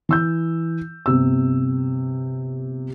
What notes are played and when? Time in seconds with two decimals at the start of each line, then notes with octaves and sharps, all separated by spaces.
0.09 E3 E6 G6
1.06 G1 C3 E6